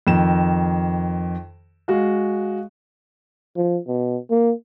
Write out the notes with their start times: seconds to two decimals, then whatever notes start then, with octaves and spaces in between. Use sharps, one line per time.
0.07 F2 D#3 E7
1.88 G#3 F#4 F5
3.56 F3
3.88 B2
4.30 A#3